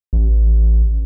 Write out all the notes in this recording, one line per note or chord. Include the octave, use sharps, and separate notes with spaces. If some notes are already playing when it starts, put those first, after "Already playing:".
A1